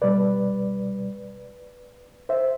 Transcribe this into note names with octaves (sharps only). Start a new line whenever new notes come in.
C2 B2 G3 B4 D5
C5 E5